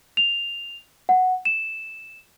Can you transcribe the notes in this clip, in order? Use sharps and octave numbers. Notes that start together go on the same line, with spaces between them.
F7
F#5
E7